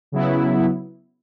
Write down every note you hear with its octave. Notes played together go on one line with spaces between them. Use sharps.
C#3 F#3 B3 E4